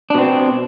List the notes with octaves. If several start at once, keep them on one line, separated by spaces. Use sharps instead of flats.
B2 C4 D4